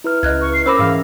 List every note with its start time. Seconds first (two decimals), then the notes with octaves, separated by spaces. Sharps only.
0.04 E4 B4 F6
0.23 C#2 D#5 F#6 G#6
0.41 C#6
0.54 C7
0.66 C#4 A#4 C5 B5 D6 E6 A#6
0.79 G#2 E3 F5